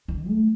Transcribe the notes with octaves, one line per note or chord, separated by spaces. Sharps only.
D3
A3